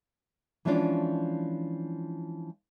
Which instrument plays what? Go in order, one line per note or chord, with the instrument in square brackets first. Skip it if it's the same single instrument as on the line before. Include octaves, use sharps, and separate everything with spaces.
[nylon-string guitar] E3 F3 G#3 C#4 D4 F4